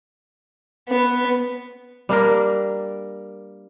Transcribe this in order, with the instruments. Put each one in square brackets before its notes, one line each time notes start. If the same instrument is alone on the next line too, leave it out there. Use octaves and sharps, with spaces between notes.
[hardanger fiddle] B3
[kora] G3 A#3 D4 A#4